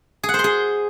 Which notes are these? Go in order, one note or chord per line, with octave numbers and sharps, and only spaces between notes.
G#4
F#5
C5
C6
G#4